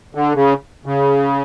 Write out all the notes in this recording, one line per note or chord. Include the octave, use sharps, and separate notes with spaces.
D3
C#3
C#3